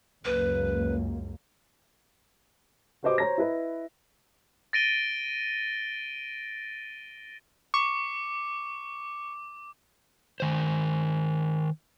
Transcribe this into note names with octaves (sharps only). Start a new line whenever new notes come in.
C#2 F#2 A#3 B4
F#4 G4 B4 C5 D#5 D6
C5 C#5 A#5 A#6
E4 B4 D#5
A6 A#6 D7 D#7 G7
C#6 D6
D#3 C5